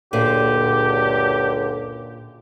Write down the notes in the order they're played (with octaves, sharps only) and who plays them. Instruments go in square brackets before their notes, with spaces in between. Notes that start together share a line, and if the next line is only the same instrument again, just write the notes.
[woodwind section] C#2 F#2 D3 [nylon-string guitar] A#2 [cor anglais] G4